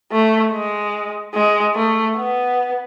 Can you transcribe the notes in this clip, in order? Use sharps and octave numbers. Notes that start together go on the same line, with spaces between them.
A3
G#3
G#3
A3
B3